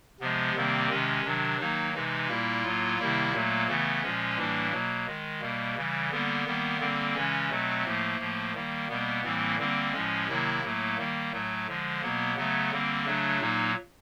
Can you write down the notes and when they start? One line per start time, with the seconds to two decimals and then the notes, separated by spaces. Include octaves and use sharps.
0.20 C3 F3 G#3 B3
0.55 C3 D#3 G3 A#3 C4
0.89 C3 D#3 G#3 C#4
1.24 C3 D#3 F#3 D4
1.60 D#3 F#3 A#3 D#4
1.94 C3 E3 G#3 D#4
2.29 A#2 G3 A#3 E4
2.63 A2 F#3 A#3 F4
2.99 C3 D#3 G3 A#3 E4
3.33 A#2 F#3 A3 A#3
3.68 C#3 E3 A3 B3
4.02 A#2 F3 G#3 C#4
4.37 A2 E3 G3 A#3 D4
4.72 B2 F#3 A#3
5.07 D#3 G#3
5.41 B2 G3 A#3
5.76 C#3 E3 G3
6.11 D3 G3 A#3 B3
6.46 D#3 G3 A#3
6.80 D3 G3 A#3 C4
7.15 C#3 E3 G#3 C#4
7.50 B2 F#3 A3 C4
7.85 A2 F3 A3 A#3
8.20 A2 F3 A3
8.54 D#3 G3 A#3
8.88 B2 G3 A#3 B3
9.23 A2 E3 G3 A#3 C4
9.58 D3 G3 A#3 C4
9.93 A2 F3 G#3 C#4
10.27 C3 D#3 F#3 A#3 E4
10.63 A2 F#3 A3 A#3
10.97 D#3 G3 A#3
11.32 A2 F#3 A3
11.67 D3 F3 G#3
12.01 B2 F#3 A#3 B3
12.37 C#3 F#3 A3 B3
12.71 D3 G3 A#3 C4
13.05 C#3 F#3 A3 D4
13.40 A#2 F#3 A#3 D#4